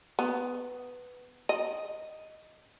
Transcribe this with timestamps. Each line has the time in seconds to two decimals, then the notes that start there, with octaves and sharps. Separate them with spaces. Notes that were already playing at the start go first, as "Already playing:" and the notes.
0.19 B3
1.49 D#5